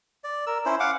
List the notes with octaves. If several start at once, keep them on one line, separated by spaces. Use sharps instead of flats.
D5
A#4 E6
C#4 E4 C5
F5 F#5 D6